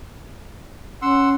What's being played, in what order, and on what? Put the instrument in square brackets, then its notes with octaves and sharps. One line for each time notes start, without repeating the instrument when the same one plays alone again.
[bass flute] C#4 [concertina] F#5 C6 E6